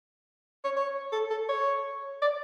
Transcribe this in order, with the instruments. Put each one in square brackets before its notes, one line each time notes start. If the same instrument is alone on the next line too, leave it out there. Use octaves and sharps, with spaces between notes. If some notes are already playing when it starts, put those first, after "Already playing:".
[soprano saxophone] C#5
C#5
A4
A4
C#5
D5